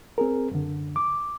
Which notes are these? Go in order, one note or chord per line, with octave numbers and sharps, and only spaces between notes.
C4 G#4 A#4
F#2 D3
D6